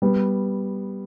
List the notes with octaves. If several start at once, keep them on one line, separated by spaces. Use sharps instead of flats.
G3 B3